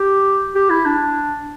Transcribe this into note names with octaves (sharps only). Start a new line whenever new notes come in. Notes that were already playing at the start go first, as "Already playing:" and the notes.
Already playing: G4
G4
E4
D4